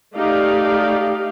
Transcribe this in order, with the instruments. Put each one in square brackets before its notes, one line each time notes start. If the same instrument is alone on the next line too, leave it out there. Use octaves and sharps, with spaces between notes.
[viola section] A3 D#4 G4 D5 F5